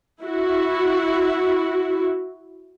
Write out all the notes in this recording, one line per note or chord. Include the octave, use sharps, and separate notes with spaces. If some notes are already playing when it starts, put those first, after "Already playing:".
E4 F#4